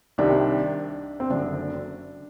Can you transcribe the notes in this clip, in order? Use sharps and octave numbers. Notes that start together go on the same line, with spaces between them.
C2 C3 D#3 D4
C4
F#1 F#2 D3 D4